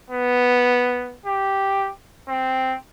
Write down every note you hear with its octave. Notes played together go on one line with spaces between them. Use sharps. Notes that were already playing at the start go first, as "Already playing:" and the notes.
B3
G4
C4